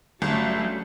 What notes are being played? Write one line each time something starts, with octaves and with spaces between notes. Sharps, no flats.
G1 F#3 G3 A3 C#4 A4